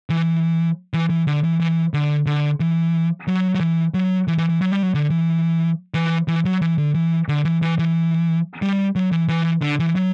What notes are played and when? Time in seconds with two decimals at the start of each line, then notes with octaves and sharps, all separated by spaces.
0.10 E3
0.94 E3
1.10 E3
1.27 D3
1.44 E3
1.60 E3
1.94 D3
2.26 D3
2.60 E3
3.28 F#3
3.55 F#3
3.60 E3
3.94 F#3
4.28 E3
4.38 E3
4.49 E3
4.61 F#3
4.72 G3
4.83 F#3
4.95 D3
5.10 E3
5.94 E3
6.28 E3
6.45 F#3
6.62 E3
6.78 D3
6.95 E3
7.28 D3
7.45 E3
7.62 E3
7.79 E3
8.62 G3
8.96 F#3
9.12 E3
9.29 E3
9.62 D3
9.79 E3
9.96 F#3